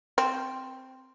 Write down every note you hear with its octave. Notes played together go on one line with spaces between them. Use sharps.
C4